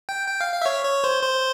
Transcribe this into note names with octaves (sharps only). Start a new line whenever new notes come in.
G5
G5
F5
F5
E5
C#5
C#5
C5
C5